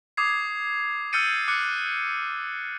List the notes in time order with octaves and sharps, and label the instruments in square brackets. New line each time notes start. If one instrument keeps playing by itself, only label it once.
[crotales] D6 D#6 G#6 C7
E6 F6 G6 A6 C#7 D#7
D6 F#6 C#7